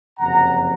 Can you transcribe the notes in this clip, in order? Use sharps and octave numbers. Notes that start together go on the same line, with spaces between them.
F#1 F2 C3 F#3 F#5 A#5